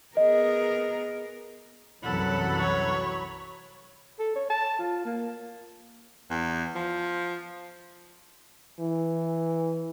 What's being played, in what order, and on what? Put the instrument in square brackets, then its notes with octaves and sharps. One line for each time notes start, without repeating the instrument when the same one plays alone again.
[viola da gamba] B3 G#4 A#4 [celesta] D#5
[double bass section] C2 F#2 E3 [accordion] F#3 B5 [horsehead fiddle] A4 F#5
[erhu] C#5
[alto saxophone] A4
C#5
A5
F4
A#3
[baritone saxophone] E2
F3
[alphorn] E3